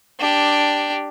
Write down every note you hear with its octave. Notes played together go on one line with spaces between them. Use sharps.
D4 G4